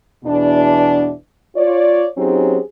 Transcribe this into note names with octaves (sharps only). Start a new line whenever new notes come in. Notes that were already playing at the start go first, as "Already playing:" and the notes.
E2 B2 D4
F4 C#5 D5
F#3 C4 C#4 D#4 G4 G#4